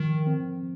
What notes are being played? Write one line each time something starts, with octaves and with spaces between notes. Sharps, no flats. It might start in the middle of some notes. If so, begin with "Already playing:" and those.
Already playing: D#3 F3
C4